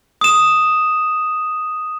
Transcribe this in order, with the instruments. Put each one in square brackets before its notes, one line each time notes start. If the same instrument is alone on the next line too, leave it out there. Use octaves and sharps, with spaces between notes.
[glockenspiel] D#6 E7